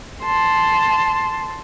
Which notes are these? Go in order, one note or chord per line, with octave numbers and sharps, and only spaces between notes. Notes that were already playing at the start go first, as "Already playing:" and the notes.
A5 C6